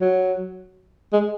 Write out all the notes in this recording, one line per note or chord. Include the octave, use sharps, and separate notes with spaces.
F#3
G#3